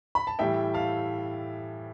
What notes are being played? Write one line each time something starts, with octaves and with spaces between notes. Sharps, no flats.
B5
A5
A2 E3 G3 E5 G5
F5 A5